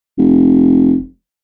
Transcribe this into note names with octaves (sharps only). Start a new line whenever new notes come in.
F1